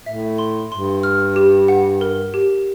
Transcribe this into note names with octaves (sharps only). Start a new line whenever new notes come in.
A2 E5
C6
G2 C6
F6
G4
F#5
A#4
G4